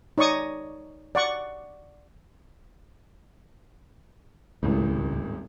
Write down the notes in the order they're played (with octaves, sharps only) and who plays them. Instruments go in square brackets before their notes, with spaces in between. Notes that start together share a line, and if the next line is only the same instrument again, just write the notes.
[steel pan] D#4 C#5 D5 C#6 D#6
D5 F#5 C#6
[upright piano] D#1 G#1 A2 [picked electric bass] C#2